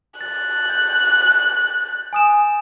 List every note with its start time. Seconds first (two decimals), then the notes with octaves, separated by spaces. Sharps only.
0.21 F#6 A6
0.70 G6
2.13 G#5 D#6 E7